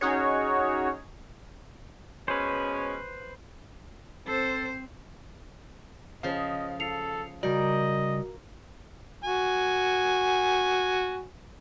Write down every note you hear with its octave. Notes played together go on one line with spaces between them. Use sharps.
C#4 D#4 F#4 G#4 C#5
B2 G#3 C#4 B4 C5
C4 A4 C5
C#3 F3 D#5 F5
A4 C7 C#7 F7
C#3 G3 F#4 A#4 D5 D#5
F#4 G#5